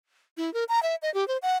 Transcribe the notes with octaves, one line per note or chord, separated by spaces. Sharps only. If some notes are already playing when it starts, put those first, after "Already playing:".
E4
A#4
A#5
E5
D#5
G4
C5
F#5